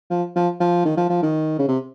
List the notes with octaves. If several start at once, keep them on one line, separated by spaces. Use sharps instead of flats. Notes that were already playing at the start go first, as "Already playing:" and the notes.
F3
F3
F3
D#3
F3
F3
D#3
C#3
C3